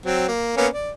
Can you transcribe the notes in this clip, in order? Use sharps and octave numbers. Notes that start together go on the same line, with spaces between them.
F#3 C4
A#3
A#3 B3 C#4
D5